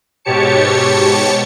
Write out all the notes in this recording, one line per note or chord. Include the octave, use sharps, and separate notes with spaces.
G#2 B2 G4 C#5 A5 C#7